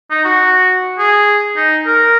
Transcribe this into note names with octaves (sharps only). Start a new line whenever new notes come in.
D#4
F#4
G#4
D#4
A#4